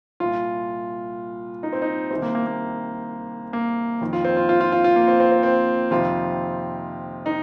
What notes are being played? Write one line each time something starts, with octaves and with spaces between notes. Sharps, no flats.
C2 A#2 F4
D#4
C4
D#4
C2 C3 D#3 C4
A#3
A#3
A#3
A#3
F2 D#3
F4
C4
F4
F4
F4
F4
F4
A#3
C4
C4
C4
C4
F2 C3 D#3 F4
D#4